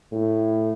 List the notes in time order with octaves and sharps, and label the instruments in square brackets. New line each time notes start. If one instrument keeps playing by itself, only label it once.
[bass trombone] A2